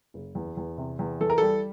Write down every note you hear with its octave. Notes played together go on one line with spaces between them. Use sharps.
F#1
E2
E2
C3
E2
E3 A4
A#4
G3 A4